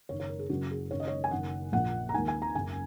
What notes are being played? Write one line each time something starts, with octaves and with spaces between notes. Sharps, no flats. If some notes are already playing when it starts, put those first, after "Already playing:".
F#1 F#2 D#3 C#5
C#5
A#4
G#4
F#1 F#2 C#3 F#4
G#4
F#1 F#2 D#3 C#5
D#5
C#5
G#5
F#1 F#2 D#3 F#5
A#1 A#2 F#5
A#5
D#2 D#3 G#5
G#5
A#5
F#1 F#2 C#3 G#5